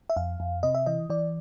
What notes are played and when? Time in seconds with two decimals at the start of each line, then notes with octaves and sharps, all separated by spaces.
0.10 E5
0.17 F2 F5
0.40 F2
0.63 C3 D#5
0.75 E5
0.86 E3 D#5
1.10 E3 D5